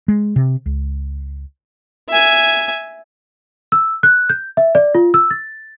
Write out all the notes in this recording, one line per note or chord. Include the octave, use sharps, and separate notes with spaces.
G#3
C3
C#2
E5 G#5
E6
F#6
G6
E5
D5
F4
E6
A6